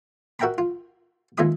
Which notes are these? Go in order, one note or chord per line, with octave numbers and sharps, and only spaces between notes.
F#4 A#4 E5 G5 A#5 B5
F4
D#2 G#3 F4 E5 B5 D#6